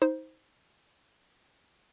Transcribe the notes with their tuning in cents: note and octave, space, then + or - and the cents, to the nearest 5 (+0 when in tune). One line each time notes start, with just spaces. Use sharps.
D#4 +30 C5 +0